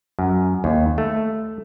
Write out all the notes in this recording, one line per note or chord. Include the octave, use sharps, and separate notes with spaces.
F#2
D#2
A3